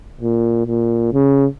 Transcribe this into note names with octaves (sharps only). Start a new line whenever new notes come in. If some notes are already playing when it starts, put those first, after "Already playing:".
A#2
A#2
C#3